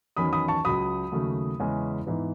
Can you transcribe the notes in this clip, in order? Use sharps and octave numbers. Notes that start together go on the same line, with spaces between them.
E2 D#3 F#3 C#4 B5 D#6
B5 D#6
A5 C#6
C#2 C#3 F#3 B5 D#6
D#2 C#3 F#3 A3
E2 C#3 E3 G#3 C#4
G#2 E3 B3